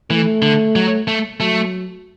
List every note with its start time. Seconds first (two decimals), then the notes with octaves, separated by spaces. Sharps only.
0.10 E3 A3
0.42 D3
0.76 F#3
1.08 A3
1.40 F#3 A3